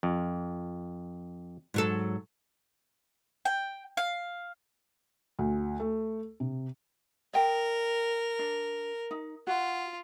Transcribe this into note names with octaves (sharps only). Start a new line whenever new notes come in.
F2
G#2 F#3 A4
G5
F5
D2
A3
C3
A#4 D#5 G5
D4
D#4
F4 F#4